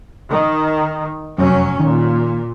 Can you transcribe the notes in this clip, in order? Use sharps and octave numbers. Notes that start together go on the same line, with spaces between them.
D#3
F1 F#2 F#3 C#4
A#2 D#3